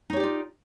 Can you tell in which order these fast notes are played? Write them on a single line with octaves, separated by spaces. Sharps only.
D#4 C#5 G4 D5 F4